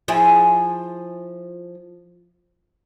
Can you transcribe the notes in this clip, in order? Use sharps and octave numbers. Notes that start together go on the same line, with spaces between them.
F3 E4 G#4